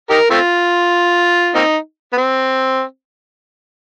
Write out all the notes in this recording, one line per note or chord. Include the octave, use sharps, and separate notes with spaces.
D#4 G4 A#4
A3 C4 F4
A#3 C4 D#4
B3
C4